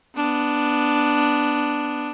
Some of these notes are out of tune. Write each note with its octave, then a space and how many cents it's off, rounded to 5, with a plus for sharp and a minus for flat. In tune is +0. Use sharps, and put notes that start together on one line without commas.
B3 +0 D4 +0